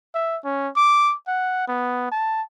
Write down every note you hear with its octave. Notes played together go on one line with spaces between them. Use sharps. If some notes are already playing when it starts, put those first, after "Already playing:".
E5
C#4
D6
F#5
B3
A5